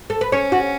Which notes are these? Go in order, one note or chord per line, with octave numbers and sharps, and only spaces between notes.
A4
B4
C#4 C#5
F#4